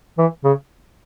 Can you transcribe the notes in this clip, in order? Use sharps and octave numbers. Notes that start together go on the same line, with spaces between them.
E3
C#3